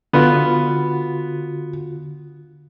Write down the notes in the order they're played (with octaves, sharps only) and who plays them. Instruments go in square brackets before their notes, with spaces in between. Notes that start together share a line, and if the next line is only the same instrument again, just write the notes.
[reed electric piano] D3 F4 F#4 [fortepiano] B3